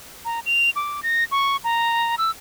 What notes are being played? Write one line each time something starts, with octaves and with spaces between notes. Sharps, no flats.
A#5
F7
D6
A#6
C#6
A#5
E6